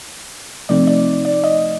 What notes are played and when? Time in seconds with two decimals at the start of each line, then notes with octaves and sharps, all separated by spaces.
0.69 C3 F3 A3 C4 D#4 D5
0.87 D5
1.25 D5
1.44 D#5